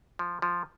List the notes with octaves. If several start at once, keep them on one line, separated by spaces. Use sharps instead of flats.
F3
F3